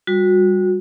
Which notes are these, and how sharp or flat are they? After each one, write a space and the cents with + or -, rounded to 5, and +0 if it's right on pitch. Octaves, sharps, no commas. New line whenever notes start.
G3 +10 F#4 -25